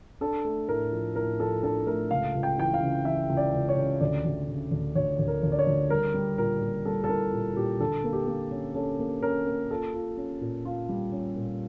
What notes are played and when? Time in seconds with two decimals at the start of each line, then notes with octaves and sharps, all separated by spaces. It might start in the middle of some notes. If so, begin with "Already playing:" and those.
0.21 D4 A4
0.45 A3
0.69 A2 A#4
0.92 F3
1.16 A2 A#4
1.39 F3 A4
1.63 D4 A4
1.87 A3 A#4
2.11 C#2 F5
2.35 C#2
2.43 G5
2.58 E3 G5
2.74 F5
2.82 C#3
3.05 E3 E5
3.30 C#2
3.37 D5
3.53 C#2
3.69 C#5
3.76 C#3
4.01 D2 D5
4.25 D2
4.48 C#3
4.71 D2
4.95 D2 C#5
5.19 D2
5.28 A#4
5.43 D2
5.52 D5
5.59 C#5
5.67 D2
5.90 G3 A#4
6.14 G3
6.38 A#2 A#4
6.61 A#2
6.85 G3 A4
7.04 A4
7.09 E4 A#4
7.32 A#2
7.56 A#2 G4
7.80 D3 A4
8.04 A#3
8.13 G4
8.27 A#3
8.51 C#4
8.75 C#4 A4
8.99 A#3
9.23 C#4 A#4
9.47 A#3
9.70 F4 A4
9.94 F4
10.17 C#4
10.41 A#2
10.65 F4
10.89 G3
11.12 C#4
11.36 A#2